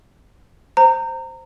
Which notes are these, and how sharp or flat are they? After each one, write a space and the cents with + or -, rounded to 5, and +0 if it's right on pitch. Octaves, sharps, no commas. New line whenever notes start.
C5 +0 A#5 -25